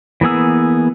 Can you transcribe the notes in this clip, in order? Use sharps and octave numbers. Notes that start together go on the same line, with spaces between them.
E3 A#3 B3 G#4 E6